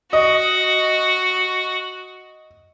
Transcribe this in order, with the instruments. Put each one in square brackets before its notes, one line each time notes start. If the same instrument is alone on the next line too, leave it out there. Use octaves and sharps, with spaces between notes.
[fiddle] F#4 [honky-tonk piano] D#5